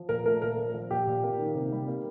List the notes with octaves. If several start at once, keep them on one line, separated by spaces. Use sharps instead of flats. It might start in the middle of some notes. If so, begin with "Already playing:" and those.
Already playing: F3
A#2 A#4
A3 A#4
A#2 A#4
F3
F3
A#2 G4
A#2
A#3
D#3
C3
G3
A#3